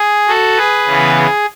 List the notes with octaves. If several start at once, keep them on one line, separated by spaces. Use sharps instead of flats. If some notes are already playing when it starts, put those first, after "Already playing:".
Already playing: G#4
F#4 A4
G#4 B4
C#3 E3 B3
G#4